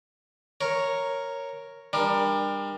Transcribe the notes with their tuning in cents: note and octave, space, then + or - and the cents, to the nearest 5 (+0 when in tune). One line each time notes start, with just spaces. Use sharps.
A#4 +0 C#5 +0
G3 +30 D4 +25 A#4 +15